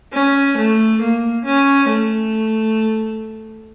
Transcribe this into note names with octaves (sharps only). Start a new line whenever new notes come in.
C#4
A3
A#3
C#4
A3